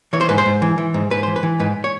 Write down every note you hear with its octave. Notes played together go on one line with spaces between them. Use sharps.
E3 C#5
C5
G#2 B4
C5
G#2
E3
E3
G#2
G#2 B4
E3 C5
B4
E3
G#2 B4
C#5